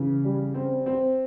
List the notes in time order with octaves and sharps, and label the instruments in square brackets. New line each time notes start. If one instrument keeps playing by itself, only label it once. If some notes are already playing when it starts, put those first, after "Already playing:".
Already playing: [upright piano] C#3 E3
G3
C4
C4